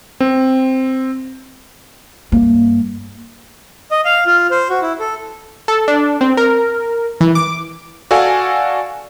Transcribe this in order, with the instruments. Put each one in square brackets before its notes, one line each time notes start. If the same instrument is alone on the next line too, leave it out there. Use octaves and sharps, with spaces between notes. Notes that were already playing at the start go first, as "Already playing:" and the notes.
[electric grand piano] C4
[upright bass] G2 A#3
[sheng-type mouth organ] D#5
F5
F4
C5
F#4
E4
A4
[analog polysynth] A4
D4
C4
A#4
E3
D6
[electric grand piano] F#4 A4 D5 F5 G#5